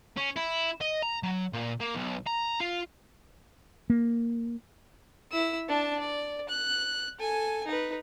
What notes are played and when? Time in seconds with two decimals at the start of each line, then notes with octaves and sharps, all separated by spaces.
0.17 C#4
0.37 E4
0.81 D#5
1.02 A#5
1.23 F#3
1.53 A#2
1.80 A#3
1.95 B1
2.27 A#5
2.60 F4
3.90 A#3
5.31 E4 E6
5.68 D4 A5
6.00 D5
6.49 F#6
7.19 A4 G#5
7.67 D#4 B4